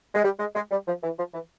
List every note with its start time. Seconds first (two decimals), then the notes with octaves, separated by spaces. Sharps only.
0.15 G#3
0.24 G3
0.39 G#3
0.55 G#3
0.71 G3
0.88 F3
1.03 E3
1.19 F3
1.34 E3